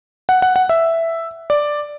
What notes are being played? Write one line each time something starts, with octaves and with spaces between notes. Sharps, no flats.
F#5
F#5
F#5
E5
D5